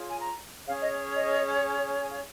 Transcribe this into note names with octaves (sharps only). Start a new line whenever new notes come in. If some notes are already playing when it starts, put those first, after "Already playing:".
Already playing: F4 G#4 C#5
G#5
A#5
C#4 G#4 C#5 F5
D#5
D#5
G#5
F5